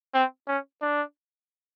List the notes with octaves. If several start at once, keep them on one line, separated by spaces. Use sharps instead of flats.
C4
C#4
D4